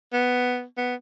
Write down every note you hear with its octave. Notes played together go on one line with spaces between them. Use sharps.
B3
B3